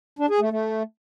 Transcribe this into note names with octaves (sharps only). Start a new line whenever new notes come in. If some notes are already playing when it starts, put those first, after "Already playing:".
D4
G#4
A3
A3